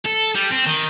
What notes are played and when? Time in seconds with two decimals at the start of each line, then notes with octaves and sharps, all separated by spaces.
0.06 A4
0.35 G3
0.51 C4
0.66 D#3